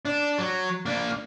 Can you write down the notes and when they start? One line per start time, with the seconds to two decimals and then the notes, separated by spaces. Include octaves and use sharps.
0.05 D4
0.38 F#3
0.86 A#3 D4